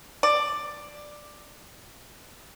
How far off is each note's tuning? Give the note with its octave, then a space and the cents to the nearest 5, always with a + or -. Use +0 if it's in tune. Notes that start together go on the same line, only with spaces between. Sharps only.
D5 +10